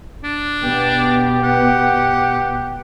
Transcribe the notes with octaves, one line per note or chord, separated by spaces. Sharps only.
D4
B2 B3 G4
F#5